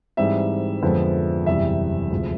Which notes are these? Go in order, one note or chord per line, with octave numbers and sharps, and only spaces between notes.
G#2 E3 G3 C4 E5
F2 D3 F3 G#3 B3
F#1 E2 C3 E3 G3 E5
D2 C3 F3 G#3